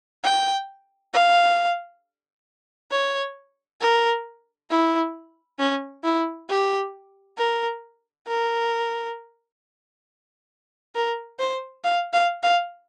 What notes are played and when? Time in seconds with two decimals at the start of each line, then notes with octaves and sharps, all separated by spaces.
0.24 G5
1.14 F5
2.91 C#5
3.81 A#4
4.71 E4
5.59 C#4
6.04 E4
6.49 G4
7.38 A#4
8.28 A#4
10.95 A#4
11.39 C5
11.84 F5
12.13 F5
12.43 F5